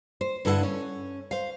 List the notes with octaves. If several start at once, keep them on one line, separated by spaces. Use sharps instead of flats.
C5
G2 D3 E4 A4 A#4 F#5
C#4
C5 F5